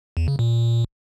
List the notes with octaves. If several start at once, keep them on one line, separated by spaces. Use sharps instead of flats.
E2
C#3
A#2